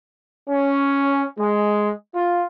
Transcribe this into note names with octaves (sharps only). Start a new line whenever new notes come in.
C#4
G#3
F4